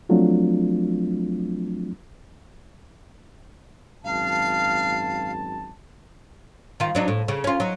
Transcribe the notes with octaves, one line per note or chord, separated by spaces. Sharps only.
F3 F#3 A3 C4 D4 F4
G#1 F#2 F5 A5
D#3 F4
F#3 D4 D#4
A2
C#3
C#4 F4
F#3 D#4